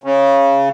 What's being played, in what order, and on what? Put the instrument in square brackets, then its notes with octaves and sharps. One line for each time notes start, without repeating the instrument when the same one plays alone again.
[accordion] C#3